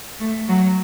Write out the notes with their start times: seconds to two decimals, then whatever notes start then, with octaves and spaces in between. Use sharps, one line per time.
0.20 A3
0.48 F#3